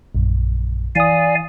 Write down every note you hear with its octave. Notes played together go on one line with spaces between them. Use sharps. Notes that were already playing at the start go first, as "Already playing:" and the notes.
A#1 F#2
E3 D5 F5 G#5 D#6